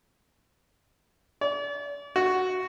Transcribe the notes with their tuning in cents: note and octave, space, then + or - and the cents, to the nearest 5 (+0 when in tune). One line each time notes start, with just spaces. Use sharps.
D5 -40
F#4 +0